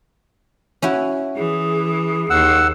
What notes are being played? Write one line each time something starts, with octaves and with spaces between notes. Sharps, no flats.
C#4 E4 F#4
E3 G#4
D#2 F#5 E6